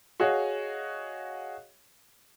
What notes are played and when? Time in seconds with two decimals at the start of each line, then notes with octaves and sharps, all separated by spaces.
0.20 F#4 G#4 C#5 D#5 F5